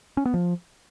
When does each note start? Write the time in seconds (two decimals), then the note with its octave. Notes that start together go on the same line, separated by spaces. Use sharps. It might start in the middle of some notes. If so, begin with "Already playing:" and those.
0.17 C#4
0.25 B3
0.34 F3